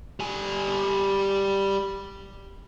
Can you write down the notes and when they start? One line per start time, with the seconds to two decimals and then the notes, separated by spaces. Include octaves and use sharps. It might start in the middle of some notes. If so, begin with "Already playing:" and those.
0.20 G3 G#5